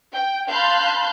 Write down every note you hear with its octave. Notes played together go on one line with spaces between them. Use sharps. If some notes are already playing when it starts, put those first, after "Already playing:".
G5
F5 A5 B5 C6 F#6 G6